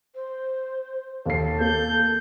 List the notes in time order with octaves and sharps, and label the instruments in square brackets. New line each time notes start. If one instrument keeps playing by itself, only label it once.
[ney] C5
[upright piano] D#2 C7 [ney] A4
[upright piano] A#3 [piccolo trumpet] G6